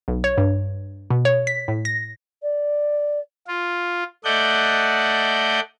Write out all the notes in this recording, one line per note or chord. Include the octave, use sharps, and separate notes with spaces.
B1
C#5
G2
B2
C#5
B6
A2
A#6
D5
F4
A3 D5 D#5 F#5 G6